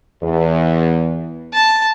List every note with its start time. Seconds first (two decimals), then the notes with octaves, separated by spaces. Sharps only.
0.23 E2
1.54 A5